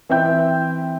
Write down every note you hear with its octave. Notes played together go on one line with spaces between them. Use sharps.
E3 C4 E5 G5 G6